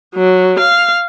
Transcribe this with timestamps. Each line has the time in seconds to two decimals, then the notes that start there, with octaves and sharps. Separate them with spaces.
0.15 F#3
0.59 F5